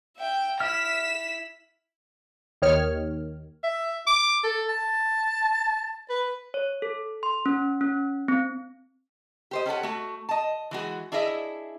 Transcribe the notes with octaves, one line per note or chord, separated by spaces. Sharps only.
E5 G5
E4 E5 F6 B6 E7
D#2 D#3 C#5 F6
E5
D6
A4
A5
B4
C#5
A4
C6
C#4
C#4
C4
G4 C5 D#5
C#4 G4 A4 F#5
A3 F#4
D#5 A5
E3 G#3 F#4
D4 E4 G#4 D#5 E5